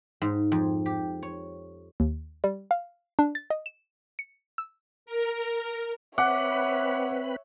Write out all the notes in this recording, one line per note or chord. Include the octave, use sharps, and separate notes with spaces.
G#2
F2
G4
C#5
D#2
G3
F5
D4
A6
D#5
E7
C#7
E6
A#4
C4 B4 C#5 E5 F#5 B5 D6